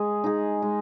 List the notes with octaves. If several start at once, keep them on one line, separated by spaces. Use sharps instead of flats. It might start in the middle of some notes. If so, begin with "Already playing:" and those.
Already playing: G#3 G#4
D#4 G#4
G#3